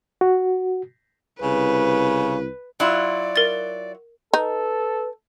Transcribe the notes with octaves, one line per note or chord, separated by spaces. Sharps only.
F#4
C2 C#3 B4
F#3 E4 F4 D5
A#4 A6
D#4 A4 B4